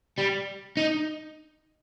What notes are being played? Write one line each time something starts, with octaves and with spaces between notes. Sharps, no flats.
G3
D#4